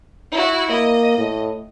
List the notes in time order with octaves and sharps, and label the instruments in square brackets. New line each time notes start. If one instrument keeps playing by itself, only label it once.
[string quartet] E4 F#4
[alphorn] A#3 [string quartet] D#5
[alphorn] A2